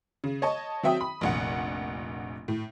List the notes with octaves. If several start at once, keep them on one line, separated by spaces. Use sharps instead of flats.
C#3
C#5 D#5 A5 C#6
F#3 C4 E5 G5 D#6
B5
F1 A#1 F#5
A2